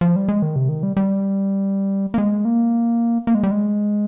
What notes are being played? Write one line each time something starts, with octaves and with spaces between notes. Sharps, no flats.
F3
G3
G#3
D#3
C3
D#3
G3
G3
A#3
G#3
A#3
A#3
G#3
G3
G#3